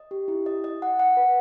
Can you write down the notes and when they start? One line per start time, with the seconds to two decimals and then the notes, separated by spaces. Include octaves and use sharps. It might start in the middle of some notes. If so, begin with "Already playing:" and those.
Already playing: D#5
0.11 G4
0.28 E4
0.46 D#5
0.64 D#5
0.82 F#5
0.99 F#5
1.17 B4